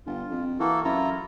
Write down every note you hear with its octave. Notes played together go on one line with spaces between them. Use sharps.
G1 F4
F2
E3 A#3 F#4 A4
F#2 E4 F4 A#5